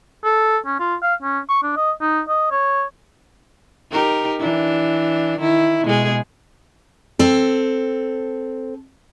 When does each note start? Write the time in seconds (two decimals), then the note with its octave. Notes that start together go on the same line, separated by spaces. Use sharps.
0.24 A4
0.66 C#4
0.79 F4
1.02 F5
1.22 C#4
1.49 C#6
1.63 D4
1.76 D#5
2.01 D#4
2.28 D#5
2.51 C#5
3.91 D#4 G4 A#4
4.40 E3 D4
5.39 D#3 E4
5.86 B2 G#3 G#4
7.19 C4 A4